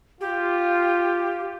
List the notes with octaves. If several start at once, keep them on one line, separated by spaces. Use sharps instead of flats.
F4 G4